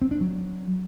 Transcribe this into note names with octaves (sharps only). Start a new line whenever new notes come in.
C4
D4
F#3